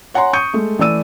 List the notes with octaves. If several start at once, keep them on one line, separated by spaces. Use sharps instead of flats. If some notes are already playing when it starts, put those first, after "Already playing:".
C#5 F#5 G#5 A#5 C6
C#6 D#6 G6 C#7 D#7
G#3 A3
E3 A3 D5 E6 D#7